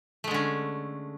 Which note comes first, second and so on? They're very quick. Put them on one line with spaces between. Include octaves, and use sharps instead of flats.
A3 G#3 D3 C#4